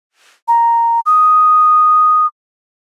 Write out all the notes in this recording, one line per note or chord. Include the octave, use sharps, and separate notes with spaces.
A#5
D#6